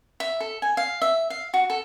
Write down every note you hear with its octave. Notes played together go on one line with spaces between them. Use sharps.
E5
A4
G#5
F5
E5
F5
F#4
A4